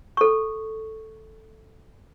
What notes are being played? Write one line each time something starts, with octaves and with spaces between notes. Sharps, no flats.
A4 C#6